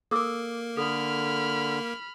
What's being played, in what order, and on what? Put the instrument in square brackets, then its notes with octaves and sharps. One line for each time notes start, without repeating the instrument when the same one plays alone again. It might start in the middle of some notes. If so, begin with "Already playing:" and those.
[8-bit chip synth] A#3 A#4 [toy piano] A4 D6 E6
[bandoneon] D3 [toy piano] A4 [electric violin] B5 F6